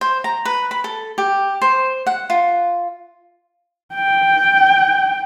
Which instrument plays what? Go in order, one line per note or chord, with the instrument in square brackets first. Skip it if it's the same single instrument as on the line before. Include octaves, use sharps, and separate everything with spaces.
[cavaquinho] C5
A#5
B4
B5
A4
G4
C5
F#5
F4
[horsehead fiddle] G5